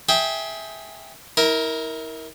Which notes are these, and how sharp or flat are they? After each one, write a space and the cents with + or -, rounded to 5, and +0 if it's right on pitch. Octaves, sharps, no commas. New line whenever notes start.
G#4 +20 E5 -10 G5 +10
E4 -35 A#4 +0